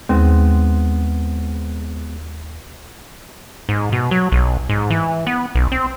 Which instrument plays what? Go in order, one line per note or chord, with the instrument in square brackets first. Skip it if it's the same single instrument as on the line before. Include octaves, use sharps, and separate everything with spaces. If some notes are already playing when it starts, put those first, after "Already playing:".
[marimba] D#2 [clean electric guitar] G#3 B3 C4
[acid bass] G#2
B2
F#3
B1
G#2
E3
B3
B1
C4